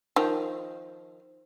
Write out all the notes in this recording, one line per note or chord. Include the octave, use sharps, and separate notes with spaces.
D#3 F3